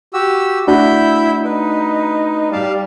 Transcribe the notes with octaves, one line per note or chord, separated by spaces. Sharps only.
F#4 G4 E6
A3 D4 E4 F#4 B5 G6
D#4 B4
G3 D5 F5 A5